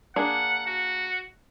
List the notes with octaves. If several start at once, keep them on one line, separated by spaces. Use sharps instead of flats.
A#3 D4 G#4 F#5
F#4